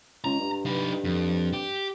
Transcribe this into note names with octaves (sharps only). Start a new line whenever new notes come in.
C#2 A#5
G2
D#4 B4
F2
G4